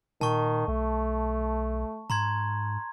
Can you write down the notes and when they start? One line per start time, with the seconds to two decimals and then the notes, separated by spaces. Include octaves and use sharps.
0.21 A#2 D#3 A5 C#6
0.68 B1 A3
2.10 G#2 A#5 C6 G#6